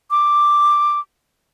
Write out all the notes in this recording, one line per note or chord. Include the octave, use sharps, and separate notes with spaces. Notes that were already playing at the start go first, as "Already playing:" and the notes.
D6